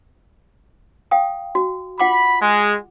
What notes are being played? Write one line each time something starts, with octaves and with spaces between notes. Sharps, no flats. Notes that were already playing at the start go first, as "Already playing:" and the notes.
F5 G5 D#6
F#4
F4 F#5 B5 D6
G#3